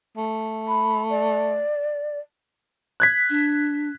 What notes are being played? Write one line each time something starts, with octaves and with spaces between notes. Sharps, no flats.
A3
B5
D5
F#6 G#6 B6
D4